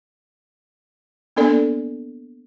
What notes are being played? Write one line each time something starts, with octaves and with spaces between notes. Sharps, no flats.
A#3 B3 D4 A4 D5